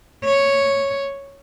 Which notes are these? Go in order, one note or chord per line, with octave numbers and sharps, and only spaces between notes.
C#5